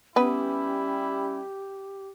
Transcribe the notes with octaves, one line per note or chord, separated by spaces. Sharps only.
G3 B3 C#4 E4 G4 B4